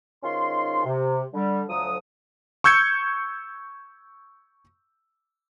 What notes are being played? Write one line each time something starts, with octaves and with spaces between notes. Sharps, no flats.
G#2 D#3 C#4 F4 C6
C3
D3 G3
D2 F3 F#3 D#6
C#6 E6 G6 G#6 C#7